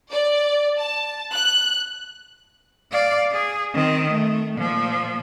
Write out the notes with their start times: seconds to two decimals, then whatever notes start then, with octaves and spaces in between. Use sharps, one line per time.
0.11 D5
0.78 A5
1.33 F#6
2.92 D5 F5
3.32 G#4
3.74 D#3 C4
4.11 A3
4.55 A#2 F3